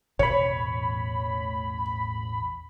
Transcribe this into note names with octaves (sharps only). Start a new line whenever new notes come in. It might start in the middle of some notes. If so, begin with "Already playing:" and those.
A1 E2 B2 E3 C#5 B5